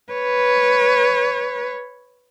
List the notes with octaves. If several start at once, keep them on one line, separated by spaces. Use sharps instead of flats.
B4 C#5